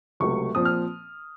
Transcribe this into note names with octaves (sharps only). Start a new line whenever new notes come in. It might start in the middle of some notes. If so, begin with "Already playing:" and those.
C#2 C3 F#3 A3 C#6
A#2 F3 C4 D#6
F6